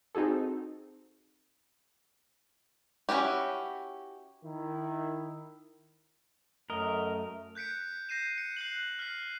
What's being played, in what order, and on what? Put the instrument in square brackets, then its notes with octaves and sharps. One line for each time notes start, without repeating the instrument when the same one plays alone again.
[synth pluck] C4 D#4 F#4 G#4 A4
[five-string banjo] C#4 E4 F#4 G4
[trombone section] D#3 E4
[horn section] F#2 A3 [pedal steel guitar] A#4 D#5
[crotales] F#6 G6 B6 C#7 D7
G6 A#6 C7 D#7 E7
C#7
F#6 C7 F#7
F6 B6